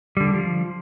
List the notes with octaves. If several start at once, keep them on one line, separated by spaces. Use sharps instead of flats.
D3 G3
F3